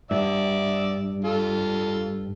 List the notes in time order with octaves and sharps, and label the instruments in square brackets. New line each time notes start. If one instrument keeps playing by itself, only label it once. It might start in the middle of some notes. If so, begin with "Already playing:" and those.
[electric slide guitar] G2 [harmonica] D5 E5
[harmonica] F4 A4